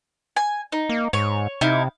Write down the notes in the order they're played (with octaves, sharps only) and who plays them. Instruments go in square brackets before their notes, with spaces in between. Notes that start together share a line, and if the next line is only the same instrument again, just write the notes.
[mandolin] G#5
D#4
[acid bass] A#3
[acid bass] G#2 [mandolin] C#5
[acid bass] C3 [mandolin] D#4 E4 F5